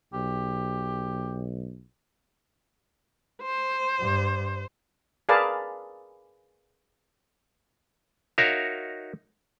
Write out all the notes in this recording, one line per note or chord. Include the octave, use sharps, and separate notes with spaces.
B1 G4
C5
G2
G#4 A#4 B4 D5 F5 A5
D#4 F#4 A#4 C#5 E5 F5